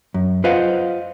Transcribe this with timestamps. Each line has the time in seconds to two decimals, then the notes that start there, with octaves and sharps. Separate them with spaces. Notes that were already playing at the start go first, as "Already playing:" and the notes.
0.14 F#2
0.44 F4 B4 C5 D#5 F5 F#5